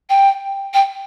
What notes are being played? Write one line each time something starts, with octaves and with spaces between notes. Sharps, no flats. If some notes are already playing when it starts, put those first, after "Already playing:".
G5
G5